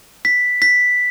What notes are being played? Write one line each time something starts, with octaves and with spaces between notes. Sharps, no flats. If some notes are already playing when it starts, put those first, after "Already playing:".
B6
B6